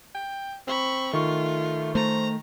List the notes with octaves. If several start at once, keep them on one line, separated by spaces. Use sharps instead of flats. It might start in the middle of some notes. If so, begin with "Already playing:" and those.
G5
C4 B5 C#6
D#3 A3 F4 C#6
A3 C5 A#5